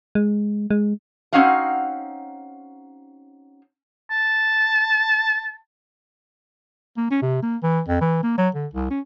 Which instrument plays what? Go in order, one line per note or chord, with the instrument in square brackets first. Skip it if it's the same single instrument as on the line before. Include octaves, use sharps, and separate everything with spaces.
[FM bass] G#3
G#3
[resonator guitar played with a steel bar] C4 C#4 D#4 F#4 F5 F#5
[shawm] A5
[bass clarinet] A#3
C#4
C3
A#3
E3
F2
E3
A#3
F#3
D3
C2
C#4